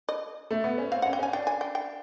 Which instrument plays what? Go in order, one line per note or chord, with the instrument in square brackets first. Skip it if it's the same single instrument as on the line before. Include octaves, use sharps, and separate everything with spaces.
[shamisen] D#5
[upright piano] A3
B3
C#4
[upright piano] C4 [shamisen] F5
[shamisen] F#5
[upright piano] C#4
[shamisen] G5
[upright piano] C#4 [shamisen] G#5
[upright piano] D4 [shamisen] G5
[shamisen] G#5
G5
G5